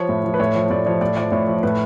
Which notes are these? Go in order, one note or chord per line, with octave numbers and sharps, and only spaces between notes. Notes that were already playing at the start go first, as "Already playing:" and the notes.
Already playing: F3 C#5
A2
F3
B4
A2 C#5
F3 C#5
A2 D5
F3 C#5
A2 D5
F3 D5
A2 C#5
F3
A2 B4